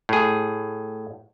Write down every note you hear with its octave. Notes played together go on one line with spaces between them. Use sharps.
A2 G#4